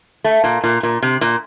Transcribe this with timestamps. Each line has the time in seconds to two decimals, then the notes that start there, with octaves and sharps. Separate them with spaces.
0.24 A3
0.44 A#2
0.63 A#2
0.83 A#2
1.02 C3
1.21 A#2